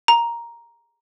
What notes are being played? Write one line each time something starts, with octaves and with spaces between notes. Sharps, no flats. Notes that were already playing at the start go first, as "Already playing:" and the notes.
A#5